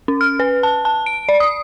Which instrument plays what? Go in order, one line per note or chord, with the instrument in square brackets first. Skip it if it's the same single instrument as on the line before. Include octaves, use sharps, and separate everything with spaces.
[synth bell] C#4
F6
B4
A5
A5
D7
D5
D#6